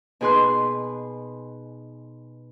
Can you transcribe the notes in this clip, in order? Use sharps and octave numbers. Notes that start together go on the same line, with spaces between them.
B2 D#4 G#4 B4 C6 F#6